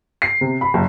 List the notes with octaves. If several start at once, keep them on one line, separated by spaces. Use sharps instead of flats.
C7
C3
B5
F#1